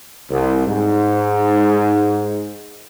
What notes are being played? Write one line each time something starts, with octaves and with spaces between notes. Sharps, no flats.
C2
G#2